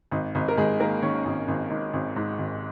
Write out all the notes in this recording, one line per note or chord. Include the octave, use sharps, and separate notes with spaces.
G#1 D#4
G#1 D#4
A#4
G#1 G#3 G#4
D#3 A#3 A#4
D#3 C#4 C#5
G#1
G#1
G#2
G#1
G#2
G#1